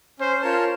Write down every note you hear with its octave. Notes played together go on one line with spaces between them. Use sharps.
C#4 C5
F4 A#4 C#5 A5